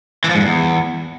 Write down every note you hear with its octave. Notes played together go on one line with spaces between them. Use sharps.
E3
F3
G#2
G2
E2